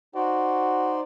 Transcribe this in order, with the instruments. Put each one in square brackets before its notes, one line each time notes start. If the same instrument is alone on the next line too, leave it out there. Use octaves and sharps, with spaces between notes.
[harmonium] D#4 C5 D5 [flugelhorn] F#4